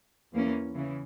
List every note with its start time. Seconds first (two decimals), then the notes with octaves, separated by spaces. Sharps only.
0.33 E2 E3 A#3 C#4
0.75 C#3 E3